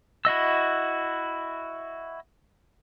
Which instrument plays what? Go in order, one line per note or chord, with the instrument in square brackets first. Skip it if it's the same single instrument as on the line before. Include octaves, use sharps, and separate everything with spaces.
[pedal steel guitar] E4 F#4 D#5 E6